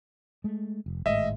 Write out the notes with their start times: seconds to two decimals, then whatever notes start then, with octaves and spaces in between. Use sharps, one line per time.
0.44 G#3 A3
0.86 F1
1.06 G#1 A2 G#3 D#5 E5